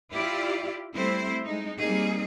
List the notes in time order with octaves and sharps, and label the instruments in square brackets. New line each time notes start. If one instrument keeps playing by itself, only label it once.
[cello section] E4 F4 G4 D5
G3 A3 C4 E4 C5
G#3 D#4
G3 A#3 C4 D#4 G#4